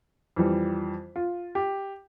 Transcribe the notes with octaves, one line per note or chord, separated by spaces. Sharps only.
F2 E3 G3
F4
G4